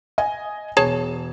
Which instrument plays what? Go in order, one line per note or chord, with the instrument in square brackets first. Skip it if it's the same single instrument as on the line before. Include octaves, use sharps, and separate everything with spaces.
[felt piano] D#5 G#5
[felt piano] E1 E7 [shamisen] G#4 C#5 A5